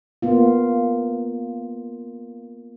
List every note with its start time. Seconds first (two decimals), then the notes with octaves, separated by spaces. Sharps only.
0.22 A#3 B3 F4